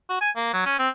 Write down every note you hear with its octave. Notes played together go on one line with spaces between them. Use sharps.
F#4
G#5
A#3
F#3
C#4
C4